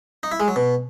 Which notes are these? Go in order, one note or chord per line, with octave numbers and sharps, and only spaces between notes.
D#4
E4
G#3
F#3
B2